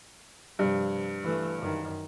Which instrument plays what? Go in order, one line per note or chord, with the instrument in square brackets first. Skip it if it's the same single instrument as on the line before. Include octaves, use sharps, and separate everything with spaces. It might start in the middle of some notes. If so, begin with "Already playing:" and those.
[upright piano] G2 [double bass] C3 F3
[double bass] E3 A3
F#2 D#3